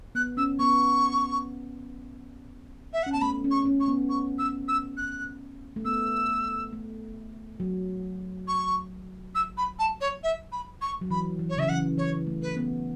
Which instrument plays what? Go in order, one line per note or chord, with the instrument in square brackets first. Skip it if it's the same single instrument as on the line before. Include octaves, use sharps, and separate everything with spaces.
[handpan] B3 [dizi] F#6
[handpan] C#4 [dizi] E6
[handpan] B3 [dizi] C#6
[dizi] E5
[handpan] C#4 [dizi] F#5
[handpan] B3 [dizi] A5
[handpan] A3 [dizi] B5
[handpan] C#4
[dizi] C#6
[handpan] C#4
[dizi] C#6
[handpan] B3
[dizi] C#6
E6
E6
F#6
[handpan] A3
[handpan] B3 [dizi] E6
[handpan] A3
F#3
[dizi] C#6
E6
B5
A5
C#5
E5
B5
C#6
[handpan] F#3
[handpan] E3 [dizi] B5
[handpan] E3
[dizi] C#5
[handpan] C#3 [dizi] E5
[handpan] E3 [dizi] F#5
[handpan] E3 [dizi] C#5
[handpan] A3
[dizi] B4
[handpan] B3